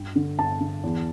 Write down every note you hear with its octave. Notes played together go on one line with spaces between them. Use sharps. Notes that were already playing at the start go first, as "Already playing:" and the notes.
Already playing: G2 G5
D3
G2 A5
D3
E2